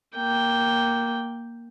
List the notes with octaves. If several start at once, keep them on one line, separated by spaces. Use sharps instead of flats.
A#3 G5